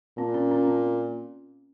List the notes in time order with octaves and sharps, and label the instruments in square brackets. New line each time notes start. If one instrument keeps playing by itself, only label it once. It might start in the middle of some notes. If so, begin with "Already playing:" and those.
[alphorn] A#2 [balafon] C4
[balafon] C#4
C#4
C4